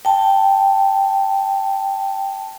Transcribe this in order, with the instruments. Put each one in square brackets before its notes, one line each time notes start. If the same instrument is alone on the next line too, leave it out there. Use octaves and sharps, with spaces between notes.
[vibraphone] G5 A5